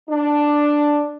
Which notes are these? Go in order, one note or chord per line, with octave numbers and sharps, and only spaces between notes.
D4